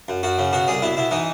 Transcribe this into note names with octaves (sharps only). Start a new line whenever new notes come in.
F#2
F#2 F#4
C#3
B2 F#4
C2 G#4
B2 E4
B2 E4
E3 D#4